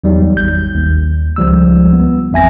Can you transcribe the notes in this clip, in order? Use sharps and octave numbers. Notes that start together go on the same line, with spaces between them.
E2 F#3 G3 D#4
G#1 G6
D#2
C#2 F3 G3 E6
B3
A1 F2 E5 G#5 A#6